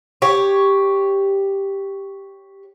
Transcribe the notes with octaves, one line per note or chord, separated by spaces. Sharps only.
G4 C#5